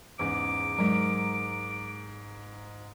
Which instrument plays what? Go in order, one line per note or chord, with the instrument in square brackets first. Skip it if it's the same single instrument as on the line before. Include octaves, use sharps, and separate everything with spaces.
[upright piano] E2 G#2 C#3 [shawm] D6
[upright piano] G#2 A#4 [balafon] F#3 G#3